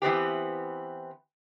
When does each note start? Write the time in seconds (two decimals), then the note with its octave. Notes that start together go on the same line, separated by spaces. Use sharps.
0.02 E3 B3 C4 G4